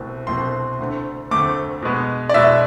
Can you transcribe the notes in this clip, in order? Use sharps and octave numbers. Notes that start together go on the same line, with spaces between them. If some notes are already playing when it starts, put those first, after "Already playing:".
Already playing: C2 B2 A3 C4
C2 B2 A3 C4 C6
D2 D3 A3 C4
D2 D3 A3 C4 D6
B2 G#3 B3
D5
B2 G#3 B3 E5